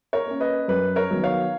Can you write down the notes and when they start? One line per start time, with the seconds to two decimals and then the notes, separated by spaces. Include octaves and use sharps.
0.13 A#4 C#5
0.26 A#3 C#4
0.40 B4 D#5
0.68 F#2 B4
0.96 A#4 C#5
1.10 D#3 F#3 B3 D#4
1.23 C#5 F5